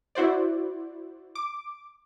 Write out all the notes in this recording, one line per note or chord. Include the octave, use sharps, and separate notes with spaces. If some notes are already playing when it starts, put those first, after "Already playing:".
E4 F#4 C5 D5
D6